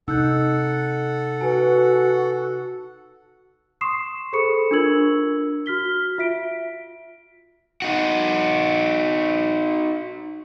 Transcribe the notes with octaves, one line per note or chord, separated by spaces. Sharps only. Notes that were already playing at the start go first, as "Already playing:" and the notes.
C3 D#4 A4 F#5 E6 F#6 G6
F#4 B4 G#5 A5
C6 C#6 D#6 C7 E7
G#4 A4 C5 B5 C#6 C#7
D4 F4 A#4 E6 G#6 F#7
F#4 F6 B6 G7
F4 E5 B6 D7
D#4 F#4